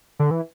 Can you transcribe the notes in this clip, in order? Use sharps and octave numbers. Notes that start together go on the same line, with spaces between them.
D3
E3